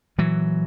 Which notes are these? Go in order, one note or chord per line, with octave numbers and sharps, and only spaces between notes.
A#2 E3 F#3